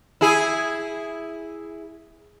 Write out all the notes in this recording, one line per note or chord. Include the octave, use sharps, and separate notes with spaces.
E4 G#4